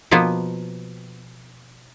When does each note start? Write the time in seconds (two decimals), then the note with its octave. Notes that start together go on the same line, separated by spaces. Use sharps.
0.11 B2 F3 A#3 B3